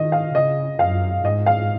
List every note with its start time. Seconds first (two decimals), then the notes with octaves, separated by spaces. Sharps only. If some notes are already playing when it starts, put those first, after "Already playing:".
Already playing: D#3 D#5
0.12 F5
0.35 C#3 D#5
0.79 F#2 F5
1.24 G#2 D#5
1.46 F5